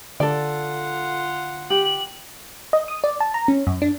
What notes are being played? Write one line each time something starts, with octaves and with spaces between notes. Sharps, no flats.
D3 F4 A4 D5 F#5
G4 F#7
D#5
D#6
D5
A5
A#5
C#4
F#2
D4